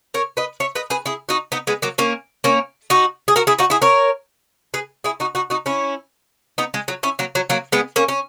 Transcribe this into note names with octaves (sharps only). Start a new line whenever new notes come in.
A#4 C#5
B4 D#5
C#5 E5
B4 D#5
G#4 B4
E4 G#4
D#4 F#4
B3 D#4
G#3 B3
F#3 A#3
A#3 C#4
A#3 C#4
D#4 F#4
G#4
F#4 A#4
E4 G#4
D#4 F#4
E4 G#4
A#4 C#5
G#4 B4
E4 G#4
D#4 F#4
D#4 F#4
D#4 F#4
C#4 E4
B3 D#4
G#3
F#3
C#4 E4
F#3 A#3
F#3
F#3 A#3
G#3 B3
A#3 C#4
C#4